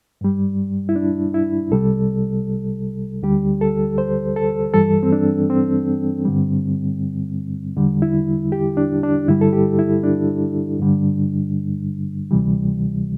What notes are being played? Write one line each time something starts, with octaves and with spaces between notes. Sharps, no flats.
G2 G3
E4
D4
E4
C2 C3 G3 A4
D2 D3 G3 G4
A4
C5
A4
G2 E3 G3 A4
C4
D4
C4
G2 D3 G3
E2 D3 G3
E4
G4
D4
D4
G2 D3 G3 E4
A4
G4
E4
D4
G2 D3 G3
D2 C3 E3 G3